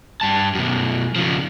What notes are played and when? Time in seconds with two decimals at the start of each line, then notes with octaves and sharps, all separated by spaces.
0.21 G2 A5
0.55 F#2 B2
1.16 C#3 F3